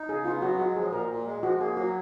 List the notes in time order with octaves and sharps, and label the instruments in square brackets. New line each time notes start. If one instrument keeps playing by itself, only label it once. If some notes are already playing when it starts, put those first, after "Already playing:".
Already playing: [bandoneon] D#4
[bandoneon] C#3 [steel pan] G#4
[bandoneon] B3 [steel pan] F4
[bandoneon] F#3 [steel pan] F#4
[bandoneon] G#3 [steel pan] F#4
[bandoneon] F3 [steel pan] G#4
[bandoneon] A#2 [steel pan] A#4
[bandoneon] A#2
G#3
[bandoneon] F3 [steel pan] F#4
[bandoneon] A#3 [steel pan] G#4
[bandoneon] F#3 [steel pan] F#4